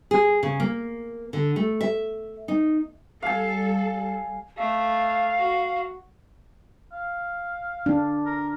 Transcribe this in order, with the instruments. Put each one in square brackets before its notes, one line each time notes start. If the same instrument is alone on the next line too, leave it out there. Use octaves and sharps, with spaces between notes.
[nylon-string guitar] G#4
C#3
A#3
D3
A3
E5
D#4
[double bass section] G3 [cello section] A4 [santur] F5 G#5
[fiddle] A3 [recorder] F5
[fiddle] F#4
[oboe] F5
[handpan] D4
[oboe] A#4